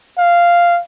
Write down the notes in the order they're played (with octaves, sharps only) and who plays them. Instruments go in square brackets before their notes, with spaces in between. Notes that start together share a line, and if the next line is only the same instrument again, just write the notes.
[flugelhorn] F5